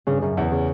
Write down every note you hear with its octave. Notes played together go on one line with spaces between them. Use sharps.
G2 C#3
F#2 C#3
E2 C#3
C#3